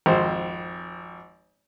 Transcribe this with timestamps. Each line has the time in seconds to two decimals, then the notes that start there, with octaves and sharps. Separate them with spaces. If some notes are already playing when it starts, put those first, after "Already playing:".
0.06 G#1 F2 C5